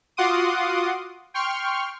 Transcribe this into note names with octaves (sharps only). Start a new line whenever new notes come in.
F4 F#4 F#5 C6 D6 D#6
G5 C6 C#6 F6